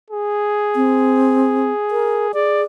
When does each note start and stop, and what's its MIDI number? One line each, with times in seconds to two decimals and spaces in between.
0.11 2.31 68
0.76 1.71 60
1.91 2.27 70
2.34 2.64 68
2.34 2.63 74